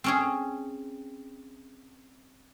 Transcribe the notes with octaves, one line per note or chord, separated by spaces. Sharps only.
C4 C#4 G#4